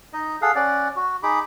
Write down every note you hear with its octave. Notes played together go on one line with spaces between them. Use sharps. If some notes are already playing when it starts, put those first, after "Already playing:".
D#4 D#5
G#4 A4 F5 F#5
C#4 D5 F#5
F#4
D#4 G#4 B5 D6